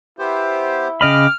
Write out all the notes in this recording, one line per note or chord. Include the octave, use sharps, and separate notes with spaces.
B3 E4 G4 C5
C#3 D#5 G5 B5 D6 F6